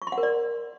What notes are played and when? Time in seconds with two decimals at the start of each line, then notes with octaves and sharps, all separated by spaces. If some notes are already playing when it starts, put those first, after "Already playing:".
0.02 C#6
0.07 C6
0.12 F#5
0.18 A#4
0.23 D5